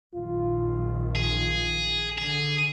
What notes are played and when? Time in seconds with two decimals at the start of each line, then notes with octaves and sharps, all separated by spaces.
0.14 A#1 F#2 D#3 F4
1.15 G#4
2.18 D3 G#4